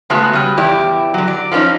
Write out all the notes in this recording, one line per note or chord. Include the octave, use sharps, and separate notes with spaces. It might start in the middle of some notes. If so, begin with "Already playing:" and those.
C#3 G#3 A3 B3 F#4
C#3 G3
E2 E4 G4 D5
D3 F#3
D5
F3 G#3 B3 C#4 D#4